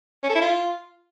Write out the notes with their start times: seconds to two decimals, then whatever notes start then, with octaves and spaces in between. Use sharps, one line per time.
0.23 C#4
0.29 A4
0.35 E4
0.41 F4